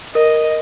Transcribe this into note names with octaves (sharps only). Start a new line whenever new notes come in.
A#4 D#5